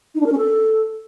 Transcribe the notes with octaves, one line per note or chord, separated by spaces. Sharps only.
D#4
D4
A#4
C#4
A4